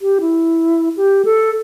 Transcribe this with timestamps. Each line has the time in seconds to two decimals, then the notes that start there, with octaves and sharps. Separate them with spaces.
0.02 G4
0.21 E4
0.97 G4
1.25 A4